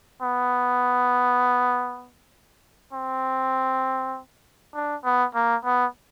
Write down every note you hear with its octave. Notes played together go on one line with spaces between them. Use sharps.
B3
C4
D4
B3
A#3
B3